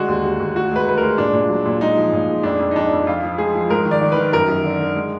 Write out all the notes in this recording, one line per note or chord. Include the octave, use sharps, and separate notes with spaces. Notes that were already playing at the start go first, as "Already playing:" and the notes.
Already playing: D3 G#3 F#4
D#2
D#2
D#2
D2 F#4
G#3 B4
D2 B4
G#3 A#4
A#2 D4
A#2
F#3
A#2
G#3 D#4
F3
A#2
G#3
F2 D4
F2
D#4
F2 D4
F2
F2 F4
F3
G#3 G#4
F3
G#2 A#4
D#3
D5
D#3
D#3 B4
F#2 A#4
F#2
D3
D3
G#3